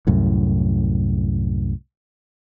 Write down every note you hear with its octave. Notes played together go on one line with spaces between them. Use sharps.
C2 F#2 A2